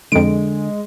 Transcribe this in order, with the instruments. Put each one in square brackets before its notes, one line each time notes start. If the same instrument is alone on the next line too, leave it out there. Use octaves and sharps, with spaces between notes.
[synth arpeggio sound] F2 D7 [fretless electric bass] D3 [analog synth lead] G#3